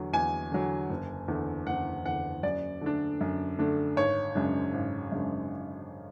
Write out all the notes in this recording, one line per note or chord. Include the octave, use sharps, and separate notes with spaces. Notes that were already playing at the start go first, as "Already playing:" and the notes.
Already playing: E2 D3 F#3
E2 G#5
D3 F#3
F#1
E2 D3
F#1 F#5
E2 D3 F#5
F#2 D5
D3 A3 D4
F#2
D3 A3 D4
G#1 C#5
F#2 C#3 G#3 D4
G#1
F#2 C#3 G#3 D4